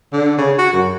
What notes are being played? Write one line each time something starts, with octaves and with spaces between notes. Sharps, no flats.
D3
C#3
F#4
F#2